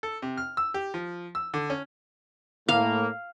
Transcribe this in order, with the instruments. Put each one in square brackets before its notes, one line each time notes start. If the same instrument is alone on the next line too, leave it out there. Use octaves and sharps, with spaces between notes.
[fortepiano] A4
C3
F6
E6
G4
F3
E6
D3
C#4
[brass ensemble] A2 A#3 [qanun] F5